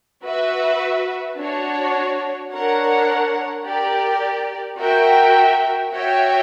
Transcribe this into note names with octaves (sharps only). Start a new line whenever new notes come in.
F#4 B4 E5
D4 F#4 C#5
D4 A#4 C#5 F#5
G4 A#4 D5
F#4 A#4 E5 G5
F#4 C#5 E5 G5